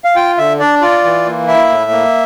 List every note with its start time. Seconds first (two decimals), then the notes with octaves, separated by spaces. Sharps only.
0.04 F5
0.16 F4 G5
0.38 D3 E5
0.60 D4 D5
0.81 F4 D5
1.04 E3
1.26 A#3
1.47 E4 E5
1.69 A2
1.91 A#3